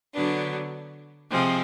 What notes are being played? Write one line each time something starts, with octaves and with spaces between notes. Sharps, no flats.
D3 F#3 B3 D4
C3 F3 G#3 C4